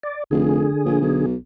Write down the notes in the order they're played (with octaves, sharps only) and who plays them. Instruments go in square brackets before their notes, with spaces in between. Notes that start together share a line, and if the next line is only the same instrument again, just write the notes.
[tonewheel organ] D5
[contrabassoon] F1 [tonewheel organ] D3 G#4
[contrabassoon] A#1
B1